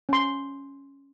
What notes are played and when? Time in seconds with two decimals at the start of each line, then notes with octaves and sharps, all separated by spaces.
0.09 C#4 C6